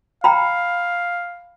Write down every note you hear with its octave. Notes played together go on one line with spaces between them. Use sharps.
F5 G5 A#5 B5